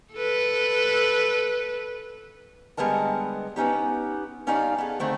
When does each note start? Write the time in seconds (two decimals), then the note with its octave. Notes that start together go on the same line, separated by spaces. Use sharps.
0.13 A4 B4
2.77 D3 G3 G#3 B3 A#4 A5
3.56 B3 C#4 D#4 G4
4.47 G2 C#4 D#4 G4 D5 F5
4.78 B3 G#4 A4
5.00 D3 D#3 A3 C4